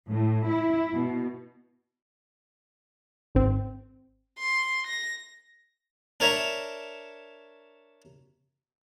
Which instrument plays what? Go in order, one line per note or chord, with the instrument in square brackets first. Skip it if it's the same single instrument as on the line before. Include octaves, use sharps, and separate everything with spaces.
[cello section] A2
E4
B2
[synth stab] G#1 C4
[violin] C6
A#6
[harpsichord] D4 A#4 C#5 E5 A#5